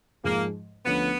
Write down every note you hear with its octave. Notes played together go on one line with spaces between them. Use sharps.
G#2 F3 G#3 A#3
D2 D3 F3 A3 B3 C#4